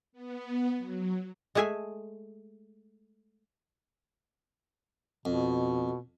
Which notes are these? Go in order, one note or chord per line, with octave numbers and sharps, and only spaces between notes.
B3
F#3
G#3 A3 G#4 E5 G#5
F2 B2